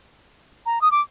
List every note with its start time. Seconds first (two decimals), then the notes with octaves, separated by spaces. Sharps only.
0.66 A#5
0.81 D#6
0.91 D6